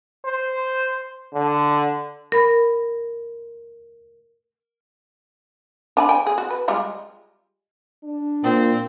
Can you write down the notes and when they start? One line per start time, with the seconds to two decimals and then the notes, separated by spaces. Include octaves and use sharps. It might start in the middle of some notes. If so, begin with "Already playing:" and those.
0.25 C5
1.33 D3
2.32 A#4 B5
5.97 D4 G#5 B5
6.09 G5 G#5
6.26 G#4
6.38 F#4
6.51 B4
6.68 G3 G#3 F4
8.04 D4
8.43 A#2 C4